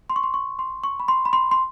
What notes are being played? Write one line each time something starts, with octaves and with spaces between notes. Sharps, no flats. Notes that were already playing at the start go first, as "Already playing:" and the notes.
C6
C#6
C6
C#6
C6
C#6
B5
C6
B5
C6
C6